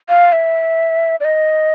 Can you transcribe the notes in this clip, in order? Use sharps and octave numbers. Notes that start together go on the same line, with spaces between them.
F5
E5
D5
D#5